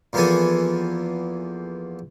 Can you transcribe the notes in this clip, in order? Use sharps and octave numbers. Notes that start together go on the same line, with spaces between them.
E2 F3 A#3 B3 A4 G#5